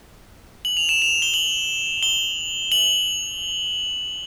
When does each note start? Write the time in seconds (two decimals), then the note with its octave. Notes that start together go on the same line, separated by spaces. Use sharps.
0.65 F#7
0.77 F7
0.89 E7
1.02 F7
1.22 G7
1.34 F#7
2.03 G7
2.72 F#7